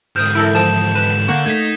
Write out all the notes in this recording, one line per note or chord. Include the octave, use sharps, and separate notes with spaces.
G#2 D3 D#6 F6 G6 D7 E7
E4 A4 A#4 D7
F3 A5 D#6 D7 E7
B4 E7
D3 A#3 F#5 C#6
A3 D#4 G#6 B6